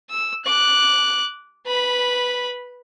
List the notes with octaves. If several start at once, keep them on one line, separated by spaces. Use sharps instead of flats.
E6
D6 F#6
B4 B5